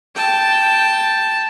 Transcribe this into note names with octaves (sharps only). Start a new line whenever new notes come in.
G5 A5